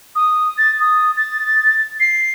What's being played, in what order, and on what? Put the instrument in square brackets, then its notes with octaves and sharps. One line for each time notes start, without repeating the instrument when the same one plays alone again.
[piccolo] D#6
A6
D#6
A6
C7